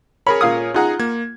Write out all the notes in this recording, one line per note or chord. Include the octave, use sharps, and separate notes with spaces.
G#4 A#4 C#5 B5
A#2 F5 D#6
D#4 F4 G#4 F#5 A#5
A#3 G#6